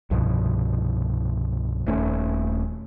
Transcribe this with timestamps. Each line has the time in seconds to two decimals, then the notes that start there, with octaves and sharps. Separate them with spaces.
0.11 C2 G2 B2 F3
1.86 D#1 A3 C4 C#4